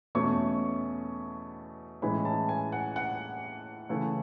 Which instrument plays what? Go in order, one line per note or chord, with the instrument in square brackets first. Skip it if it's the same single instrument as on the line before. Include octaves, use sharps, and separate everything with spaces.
[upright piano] E2 B2 A3 C#4 C#6
A2 E3 G#3 C#4 B5
A5
G#5
F#5
F#5
C#3 E3 A3